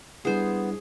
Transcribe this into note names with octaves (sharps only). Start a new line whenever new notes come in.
G3 B3 D4 E4 G#4 C5